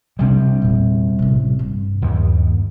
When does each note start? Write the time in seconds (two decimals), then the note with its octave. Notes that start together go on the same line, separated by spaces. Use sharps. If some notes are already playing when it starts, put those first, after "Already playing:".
0.19 C3 G3 C4 D4
0.62 E2 A#2
1.19 A1 C3
1.59 G2
2.02 D#2